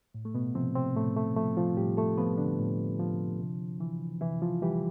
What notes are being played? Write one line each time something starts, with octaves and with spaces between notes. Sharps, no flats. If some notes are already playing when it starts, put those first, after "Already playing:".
A2
A3
B2 B3
C3 F3 C4
C3 C4
A2 A3
A3
F3 A3
F3 F4
A2 G3 G4
A3 A4
F3 B3 B4
D3 D4
A2
F3
C3
E3
C3 E3 E4
F3 F4
E3 G3 G4